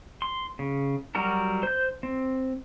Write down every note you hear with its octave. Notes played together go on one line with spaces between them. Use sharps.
C6
C#3
F#3 G3 F#4 A#4 A#5
C5 G6
C4